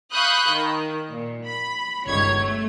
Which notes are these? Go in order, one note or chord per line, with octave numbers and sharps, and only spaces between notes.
F5 B5 C#6 D#6 F#6 G6
D#3
A#2
B5
G1 C#2 D#3 C#5 G#6
A3